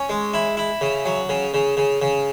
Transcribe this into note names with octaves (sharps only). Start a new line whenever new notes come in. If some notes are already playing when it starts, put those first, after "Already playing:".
Already playing: C#4
G#3
E4
E4
C#3
F#3
C#3
C#3
C#3
C#3